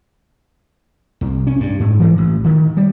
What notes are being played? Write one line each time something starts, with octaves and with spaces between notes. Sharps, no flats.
C2
C#4
G2
G#2
E3
A1
D#3
G3